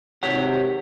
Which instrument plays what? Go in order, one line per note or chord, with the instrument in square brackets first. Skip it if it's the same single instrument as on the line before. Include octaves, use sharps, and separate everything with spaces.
[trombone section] G#1 C3 [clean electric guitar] G4 C#5 F#5